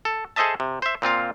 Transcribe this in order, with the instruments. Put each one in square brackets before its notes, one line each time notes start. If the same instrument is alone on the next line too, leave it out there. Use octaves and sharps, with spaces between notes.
[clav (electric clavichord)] A4
G#4 A4 C5 D#5 E5 A5
C3
C5 E5
A#2 C4 F4 F5